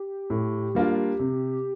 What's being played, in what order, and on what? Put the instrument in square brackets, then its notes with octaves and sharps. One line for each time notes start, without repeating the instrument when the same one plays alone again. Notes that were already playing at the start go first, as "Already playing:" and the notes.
Already playing: [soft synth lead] G4
[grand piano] A2
G3 A#3 D4 F4
C3